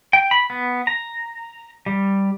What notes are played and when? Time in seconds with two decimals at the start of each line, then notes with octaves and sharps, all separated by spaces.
0.13 G5
0.31 B5
0.50 B3
0.87 A#5
1.86 G3